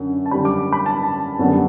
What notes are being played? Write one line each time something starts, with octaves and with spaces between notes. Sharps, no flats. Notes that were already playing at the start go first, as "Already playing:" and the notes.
Already playing: F#2 D3
A5
F#2 D3 G3 B5
D6
B5
A5
F#2 D3 G3 B3